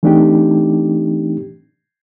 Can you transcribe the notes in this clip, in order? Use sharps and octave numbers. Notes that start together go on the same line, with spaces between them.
E3 A3 C4 D4 D#4 G4